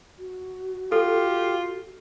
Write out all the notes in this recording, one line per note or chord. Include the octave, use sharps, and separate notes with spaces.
F#4
F4 G4 A4